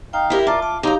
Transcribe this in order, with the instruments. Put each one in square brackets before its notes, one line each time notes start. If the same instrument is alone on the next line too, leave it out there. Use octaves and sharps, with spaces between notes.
[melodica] D#4 F5 [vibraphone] G5
[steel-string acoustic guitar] E4 G4 A#4
[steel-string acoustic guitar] F4 [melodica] A#4 D5 [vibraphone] A5
[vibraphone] A5 [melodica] D6
[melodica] F#3 G#3 D6 [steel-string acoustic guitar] D#4 A#5 [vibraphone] G4 F5